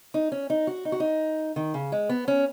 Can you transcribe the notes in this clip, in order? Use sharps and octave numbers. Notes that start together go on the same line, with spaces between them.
D#4
C#4
D#4
F#4
D#4
F#4
D#4
D#3
C#3
G#3
B3
C#4